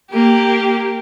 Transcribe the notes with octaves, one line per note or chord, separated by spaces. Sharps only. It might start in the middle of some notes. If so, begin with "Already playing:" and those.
A#3 G4